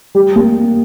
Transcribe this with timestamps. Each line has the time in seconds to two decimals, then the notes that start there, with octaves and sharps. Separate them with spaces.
0.15 G3
0.36 A#3